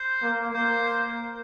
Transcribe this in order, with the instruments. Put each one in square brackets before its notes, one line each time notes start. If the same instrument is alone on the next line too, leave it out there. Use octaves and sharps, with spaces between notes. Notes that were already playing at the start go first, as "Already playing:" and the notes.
Already playing: [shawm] C5
[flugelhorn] A#3
[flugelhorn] A#3 [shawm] C5